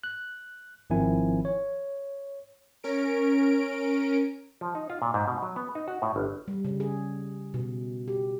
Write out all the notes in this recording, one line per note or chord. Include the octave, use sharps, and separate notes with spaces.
F#6
G#1 D#3 F3 C4 E4 G#5
C#5
C#4 A#4 D7
F3
D#4
F4
A#2
G#2
B2
F#3
B3
D#4
F#4
A2
G1
G3
C#3
G#4
B2
G4